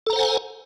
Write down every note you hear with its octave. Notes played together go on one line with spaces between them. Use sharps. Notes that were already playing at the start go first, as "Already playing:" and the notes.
A4 C5 F#5 G#5 A#5